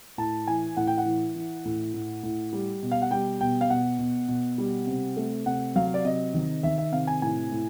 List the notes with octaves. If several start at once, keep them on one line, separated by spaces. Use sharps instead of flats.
A2 A5
E3 G#5
A2 F#5
G5
F#5
E3
E3
A2
A2
A2
G3
B2
F5
F#5
G3 G5
B2 G5
F5
B2 F#5
B2
B2
G3
C3
A3
C3 F#5
F#3 F5
D5
C3 D#5
D#3
D#3 E5
E5
C3 F5
G#5
A2 G#5
A2